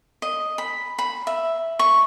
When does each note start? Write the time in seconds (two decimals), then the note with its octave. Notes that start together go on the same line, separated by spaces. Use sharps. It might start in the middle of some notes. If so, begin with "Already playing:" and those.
0.22 D#5
0.58 B5
0.99 B5
1.27 E5
1.79 C#6